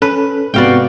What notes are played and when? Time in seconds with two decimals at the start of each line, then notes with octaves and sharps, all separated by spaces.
0.02 C#4 A4 B4
0.54 G#2 C3 B3 F#4 B4 D5 F5 G5